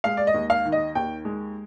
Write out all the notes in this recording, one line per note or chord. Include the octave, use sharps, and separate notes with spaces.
G#3 F5
D5
D#5
D#2
F5
D#3
D#5
D#2 G5
G#3